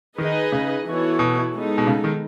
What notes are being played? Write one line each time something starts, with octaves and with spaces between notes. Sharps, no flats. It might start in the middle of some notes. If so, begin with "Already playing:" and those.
D#3 D#4 G#4 B4 D#5
C#3
E3 B3 F#4 A4 C#5
B2
G#3 B3 D#4 A4
B2
C#3
D#3